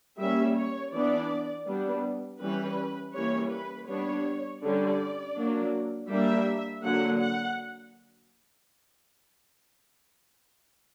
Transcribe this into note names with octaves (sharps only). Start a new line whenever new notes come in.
G3 A#3 C#4 E5
C#5
E3 B3 D4 D5
G3 B3 D4
E3 G3 C#4 B4
E3 G3 A#3 C#4 C#5
B4
G3 B3 D4 C#5
D3 G3 C#4 D5
F#3 A#3 D4
G3 A#3 D4 E5
D3 F#3 A#3 F#5
F#5